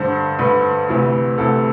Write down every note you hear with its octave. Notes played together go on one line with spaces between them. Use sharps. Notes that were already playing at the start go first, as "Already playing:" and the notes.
Already playing: G2 D3 C5
G2 D3 B4
D2 C3 E3
D2 C3 E3 A4